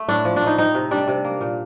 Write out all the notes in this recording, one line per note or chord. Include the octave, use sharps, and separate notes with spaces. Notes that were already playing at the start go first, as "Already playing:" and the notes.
Already playing: A3
A2 D4
F3
A2 D4
D#4
C4 D#4
C3
G3 D4
C3
A#3
A#2